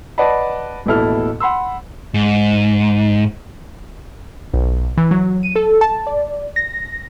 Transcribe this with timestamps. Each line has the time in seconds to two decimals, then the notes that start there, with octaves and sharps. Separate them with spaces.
0.18 B4 D5 D#5 F#5 A5 B5
0.86 A1 D#2 B2 E4 A4 F6
1.40 F#5 B5 C6 E6
2.14 G#2
4.54 B1
4.97 E3
5.11 F#3
5.43 D#7
5.56 A4
5.81 A5
6.07 D5
6.56 A#6